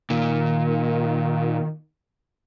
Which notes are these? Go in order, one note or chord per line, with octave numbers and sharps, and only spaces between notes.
A#2 D#3